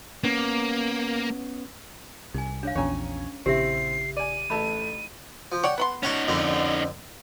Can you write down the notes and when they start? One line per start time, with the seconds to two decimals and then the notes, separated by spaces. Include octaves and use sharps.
0.24 A#3 B3 C#4
2.34 C2 D#4 G#5
2.63 D4 C#5 F5
2.75 A#1 E2 C#4 C#5 G#5 A#5
3.46 A#1 C#3 C4 E4 G4 E5 C7
4.17 D5 G#5 D#7
4.50 A1 A3 D#4 E4 A5 B5
5.52 F3
5.63 C#5 D5 F#5 G5
5.78 B3 B5 C6
6.03 C#4 D#4 C#5 F#5 A5
6.28 F2 D3 A#3